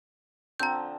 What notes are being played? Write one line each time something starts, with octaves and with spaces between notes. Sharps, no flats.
D3 F3 C4 A#5 G6